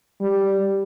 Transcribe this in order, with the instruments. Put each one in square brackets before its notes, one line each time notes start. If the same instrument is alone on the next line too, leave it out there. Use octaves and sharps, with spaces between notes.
[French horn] G3